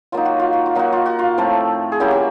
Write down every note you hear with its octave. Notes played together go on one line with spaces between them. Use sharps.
F#3 A#3 D#4 F4
F#4
F4
F#4
F4
F#3 A#3 D#4 F#4
F4
F#4
F4
A2 F3 A3 C4
G#4
F#3 A#3 C#4 E4 G4
G4